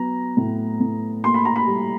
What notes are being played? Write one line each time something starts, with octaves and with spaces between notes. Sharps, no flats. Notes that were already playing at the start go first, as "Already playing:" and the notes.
Already playing: F#3 B3 A#5
A2
A2
A#3 C6
B5
A#5
B5
G3